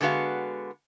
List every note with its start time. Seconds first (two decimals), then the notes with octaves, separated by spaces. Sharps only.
0.01 D3 G#3 B3 F#4 F5